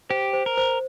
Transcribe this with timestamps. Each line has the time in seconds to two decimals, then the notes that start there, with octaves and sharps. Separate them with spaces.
0.10 G4 C5
0.33 C5
0.46 A#4
0.57 C5